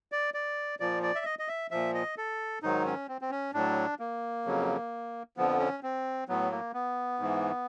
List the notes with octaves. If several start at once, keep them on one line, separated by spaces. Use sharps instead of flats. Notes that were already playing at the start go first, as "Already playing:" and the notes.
D5
D5
A#2 F3 D5
D5
E5
D#5
D#5
E5
A#2 F3 E5
D#5
A4
G#2 D#3 F#3 D#4
C#4
C4
C4
C#4
A2 F#3 D4
A#3
F2 C#3 F#3
F2 D3 F3 B3
C#4
C4
A2 F#3 B3
A#3
B3
G#2 E3